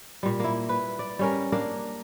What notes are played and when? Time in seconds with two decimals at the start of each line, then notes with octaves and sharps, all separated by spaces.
0.23 A#2 G3
0.40 A#3 E4
0.69 B4
0.99 D5
1.19 G3 C#4 A#4
1.52 A#3 D4 A#4